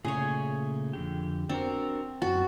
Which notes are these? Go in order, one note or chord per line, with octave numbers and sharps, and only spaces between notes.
A#2 C#3 A3 G#4 C#5
F2 D3 G4
C4 D4 F#4 A#4
F#2 F#4 A5